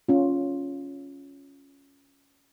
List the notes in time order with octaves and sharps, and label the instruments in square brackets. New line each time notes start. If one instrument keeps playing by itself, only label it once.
[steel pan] C#4 F4